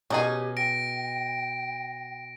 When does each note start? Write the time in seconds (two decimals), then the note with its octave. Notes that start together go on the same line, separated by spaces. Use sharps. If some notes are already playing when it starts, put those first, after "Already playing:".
0.10 B2 C#4 D#4 G4 G#4 G#5
0.57 G5 A#6 D7